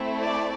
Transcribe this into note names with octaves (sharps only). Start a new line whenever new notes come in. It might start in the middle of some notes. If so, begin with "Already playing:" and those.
Already playing: A3 C4 E4
D5